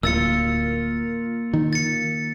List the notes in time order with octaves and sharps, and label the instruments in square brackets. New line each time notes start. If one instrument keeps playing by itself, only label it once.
[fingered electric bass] D1 [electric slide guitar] A#3 F4 [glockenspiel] E6 A6 C#7
[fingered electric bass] D#3
[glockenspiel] A6 C#7